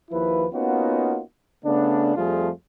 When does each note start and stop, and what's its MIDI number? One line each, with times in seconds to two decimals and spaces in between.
0.11 0.47 39
0.11 0.47 53
0.11 0.47 64
0.11 0.47 71
0.53 1.20 58
0.53 1.20 59
0.53 1.20 61
0.53 1.20 63
0.53 1.20 65
0.53 1.20 66
1.65 2.15 49
1.65 2.15 57
1.65 2.15 59
1.65 2.15 62
2.16 2.50 41
2.16 2.50 53
2.16 2.50 55
2.16 2.50 57
2.16 2.50 65
2.16 2.50 68